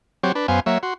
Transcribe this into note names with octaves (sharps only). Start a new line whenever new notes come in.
F#3 C4 G4 C#5
D4 B4
F#2 B3 C5 F5 G#5
F#3 A#3 C#5 E5
F#4 C6